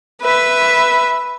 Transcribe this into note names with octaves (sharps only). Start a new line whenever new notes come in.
B4 E5